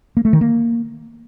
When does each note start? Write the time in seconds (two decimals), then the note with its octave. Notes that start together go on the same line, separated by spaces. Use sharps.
0.17 A#3
0.25 A3
0.33 D#3
0.41 A#3